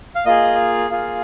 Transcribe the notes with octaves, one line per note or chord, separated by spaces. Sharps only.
F5
A#3 F4 G#4 D#5
A#3 F4 G#4